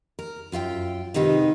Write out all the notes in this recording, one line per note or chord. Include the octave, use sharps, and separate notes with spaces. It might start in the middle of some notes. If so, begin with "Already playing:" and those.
A#4
F#2 F4 E5 G5
G#2 C3 D#3 D#4 A4 B4